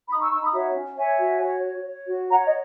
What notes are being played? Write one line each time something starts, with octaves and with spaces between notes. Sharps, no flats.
D#4 B5 D#6
C#6 E6
D#4 C#6 E6
B5 D#6
F#4 C#5 E5
C#4
C#5 E5 G#5
F#4
C#5
C#5
C#5
F#4
C#5 F#5 A#5
D#5